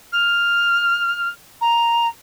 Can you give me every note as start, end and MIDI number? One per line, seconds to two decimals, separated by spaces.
0.12 1.29 89
1.61 2.07 82